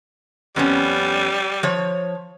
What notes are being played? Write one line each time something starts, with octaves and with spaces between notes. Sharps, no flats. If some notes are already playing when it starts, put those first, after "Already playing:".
F2 G3 B3 C#4
F3 C#5